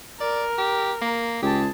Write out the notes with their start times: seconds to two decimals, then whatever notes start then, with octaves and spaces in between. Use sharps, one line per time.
0.20 A#4 D5
0.58 G4
1.01 A#3
1.42 C#2 G4 G#4 A5